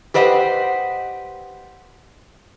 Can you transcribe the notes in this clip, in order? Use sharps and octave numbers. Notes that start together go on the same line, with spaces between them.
G4 B4 C5 D#5 F#5